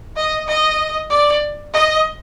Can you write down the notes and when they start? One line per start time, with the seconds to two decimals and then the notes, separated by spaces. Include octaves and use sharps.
0.16 D#5
0.48 D#5
1.10 D5
1.74 D#5